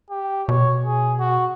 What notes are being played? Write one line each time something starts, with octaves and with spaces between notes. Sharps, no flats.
G4
B2 C#5
G#4
F#4